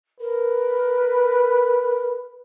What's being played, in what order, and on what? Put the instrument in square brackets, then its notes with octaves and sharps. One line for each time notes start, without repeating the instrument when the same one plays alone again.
[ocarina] A#4 [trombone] B4